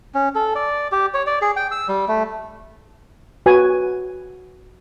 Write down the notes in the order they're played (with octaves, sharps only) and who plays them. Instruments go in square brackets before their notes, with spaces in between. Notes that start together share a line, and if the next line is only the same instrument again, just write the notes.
[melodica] C#4
A4
D5
G4
C#5
D5
G#4
G5
E6
G3
A3
[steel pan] F#4 B4 G#5